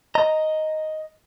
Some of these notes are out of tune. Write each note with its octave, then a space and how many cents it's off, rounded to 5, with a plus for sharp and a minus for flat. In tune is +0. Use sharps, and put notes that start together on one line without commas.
D#5 +5 A#5 +0